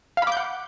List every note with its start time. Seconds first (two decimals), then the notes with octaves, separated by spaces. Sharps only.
0.17 F5
0.22 B5
0.27 D6
0.32 G6
0.37 F#5